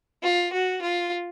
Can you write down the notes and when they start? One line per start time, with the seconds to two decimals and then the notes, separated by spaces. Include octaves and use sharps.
0.23 F4
0.52 F#4
0.81 F4